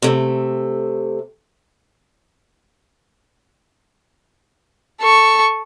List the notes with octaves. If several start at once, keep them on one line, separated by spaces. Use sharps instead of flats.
C3 A3
A4 C#6